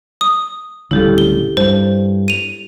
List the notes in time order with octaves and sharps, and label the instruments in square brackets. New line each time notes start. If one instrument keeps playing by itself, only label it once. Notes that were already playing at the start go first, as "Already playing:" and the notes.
[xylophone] D#6
[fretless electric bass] D1 C#3 G3 [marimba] E4 G4 A4
[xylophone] G7
[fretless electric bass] G2 [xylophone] C5
[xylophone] D#7 F7